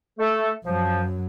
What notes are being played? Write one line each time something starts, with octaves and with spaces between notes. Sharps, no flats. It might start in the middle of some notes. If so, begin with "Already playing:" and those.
A3 A4
F#2 F3 F#3